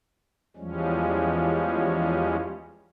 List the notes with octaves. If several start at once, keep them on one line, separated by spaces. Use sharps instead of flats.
E2 F3 G3 G#3 C#4